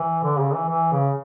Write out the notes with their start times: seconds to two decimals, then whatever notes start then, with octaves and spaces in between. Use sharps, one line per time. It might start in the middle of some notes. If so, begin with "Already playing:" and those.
Already playing: E3
0.24 D3
0.39 C#3
0.55 E3
0.69 E3
0.92 C#3